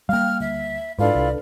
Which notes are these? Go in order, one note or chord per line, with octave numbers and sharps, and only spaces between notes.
G3 A#3 F5 G5 F6
D2 E5
G#2 D4 E4 F4 A4 B4 D5
C2